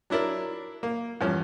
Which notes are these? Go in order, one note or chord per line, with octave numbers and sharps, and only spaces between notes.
F#3 D4 E4 A#4 D5
A#3
E2 G2 F3 C#4